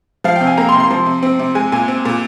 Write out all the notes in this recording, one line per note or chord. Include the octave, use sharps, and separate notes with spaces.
F3 F5
G5
C3
G#5
A#3 A#5
C6
C3
C6
F3
C3
C4
C3
G#3 G#5
A#2 G#5
C4
A#2